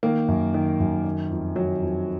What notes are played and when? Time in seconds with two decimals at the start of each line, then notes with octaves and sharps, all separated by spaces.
0.03 D#3 A#3
0.28 F#2
0.54 D#3
0.80 F#2
1.04 D#3
1.31 F2
1.56 D#3 F#3
1.82 F2